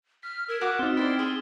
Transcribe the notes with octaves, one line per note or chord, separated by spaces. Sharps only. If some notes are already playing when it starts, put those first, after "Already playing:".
F6 B6
A#4 E6 G#6 E7
F#4 F5 F#5 D6 B6
C4 D#4 F6 A6 G7
E4 C5 D5 G5
G#4 C6